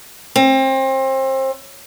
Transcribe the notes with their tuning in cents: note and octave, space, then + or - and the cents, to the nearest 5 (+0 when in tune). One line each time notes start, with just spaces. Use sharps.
C4 +30